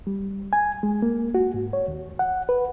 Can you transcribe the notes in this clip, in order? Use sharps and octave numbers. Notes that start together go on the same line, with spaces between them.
G3
G#5
G#3
A#3
F#4
G#2
C#5
D#2
F#5
B4